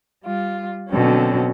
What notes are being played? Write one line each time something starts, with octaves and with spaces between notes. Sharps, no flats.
G3 F4
B2 D3 F#3 C4 C#4